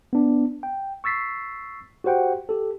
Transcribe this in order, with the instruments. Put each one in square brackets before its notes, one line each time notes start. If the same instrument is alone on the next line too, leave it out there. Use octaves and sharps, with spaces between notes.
[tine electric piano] B3 D4
G5
C#6 E6 A6 B6 C7
F#4 G4 C5 F#5 G5
G4 A4